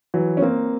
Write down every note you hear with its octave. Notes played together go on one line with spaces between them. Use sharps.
E3 F#3
C#4
A#3 C4